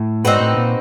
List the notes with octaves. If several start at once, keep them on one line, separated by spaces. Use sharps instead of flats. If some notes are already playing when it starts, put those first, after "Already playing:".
Already playing: A2
G#2 C4 D#4 F#4 B4
A2
A#2